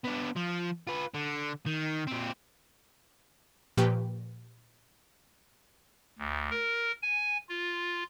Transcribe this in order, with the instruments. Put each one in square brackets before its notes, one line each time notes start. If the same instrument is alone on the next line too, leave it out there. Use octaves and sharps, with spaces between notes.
[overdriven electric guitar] B3 D4
F3
F4 B4
D3
D#3
A#2 C4
[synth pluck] A#2 F3 G4 B4 G5 C#6
[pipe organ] D2
A#4
G#5
F4